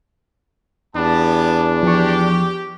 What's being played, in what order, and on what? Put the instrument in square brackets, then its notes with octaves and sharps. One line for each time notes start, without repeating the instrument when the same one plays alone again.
[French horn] E2 [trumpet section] B3 G4 A5 [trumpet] D4
[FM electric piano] F3 C#6 [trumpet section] G4